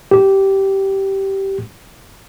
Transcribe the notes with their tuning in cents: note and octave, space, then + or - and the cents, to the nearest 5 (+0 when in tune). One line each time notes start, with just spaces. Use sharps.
G4 -15